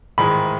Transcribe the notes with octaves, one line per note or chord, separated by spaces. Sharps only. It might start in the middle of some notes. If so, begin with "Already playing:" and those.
A1 G#2 D#3 G#3 B5